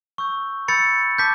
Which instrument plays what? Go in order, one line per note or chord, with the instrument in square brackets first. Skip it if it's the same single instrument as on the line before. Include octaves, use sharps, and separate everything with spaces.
[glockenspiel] C#6 E6 G6
B5 E6 G6 A6 C#7
A5 D6 G6 B6